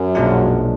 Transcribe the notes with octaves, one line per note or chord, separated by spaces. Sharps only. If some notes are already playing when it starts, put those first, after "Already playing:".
Already playing: F#2
B1 A#2 F3 G#3 D4